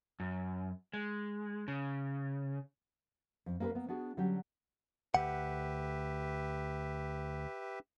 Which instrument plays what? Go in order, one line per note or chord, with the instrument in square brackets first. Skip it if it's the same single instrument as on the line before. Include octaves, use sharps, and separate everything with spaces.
[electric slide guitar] F#2
G#3
C#3
[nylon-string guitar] F2
A#3 C#4 G#4 A#4 B4
A#3 B3
B3 D4 F#4 G#4
D3 F#3 G3 C#4 F#4 G4
[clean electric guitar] D2 F#5 [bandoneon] G4 B4 E5